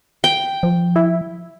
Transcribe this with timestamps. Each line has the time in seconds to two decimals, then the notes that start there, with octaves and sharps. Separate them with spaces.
0.24 G5
0.63 F3
0.96 E4